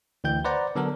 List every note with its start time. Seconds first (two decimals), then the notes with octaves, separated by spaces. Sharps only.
0.24 D2 E3 G5 G6
0.44 B4 C5 D5 F#5 A#5
0.75 D3 F#3 B3 D4 A4 A#4